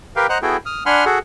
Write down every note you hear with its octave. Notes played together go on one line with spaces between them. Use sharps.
G4 A#4 B4 F5 G5
C5 D#5 F#5 A#5 F#6
B3 E4 F#4 G#4 A4 G5
D#6 F6
D4 F#5 G#5 B5 C6 F6
F#4 G#4 A4 F#5